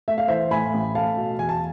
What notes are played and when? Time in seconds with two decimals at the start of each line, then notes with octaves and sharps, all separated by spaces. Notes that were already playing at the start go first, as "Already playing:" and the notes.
0.08 A3 E5
0.18 F5
0.28 E3 C5 E5
0.51 A2 G#5 B5
0.74 A1
0.95 A3 F5 A5
1.17 B2
1.39 E2 G#5
1.49 A5